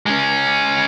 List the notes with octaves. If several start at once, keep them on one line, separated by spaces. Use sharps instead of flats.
G#3 C#4